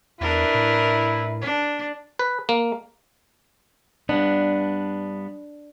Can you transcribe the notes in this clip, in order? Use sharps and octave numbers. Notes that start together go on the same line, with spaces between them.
E2 D4 E4 A#4 B4
A2
D4
B4
A#3
G2 B3 D4